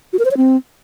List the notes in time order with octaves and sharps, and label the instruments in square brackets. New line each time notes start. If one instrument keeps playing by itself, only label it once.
[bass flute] F#4
A#4
C5
C#5
C4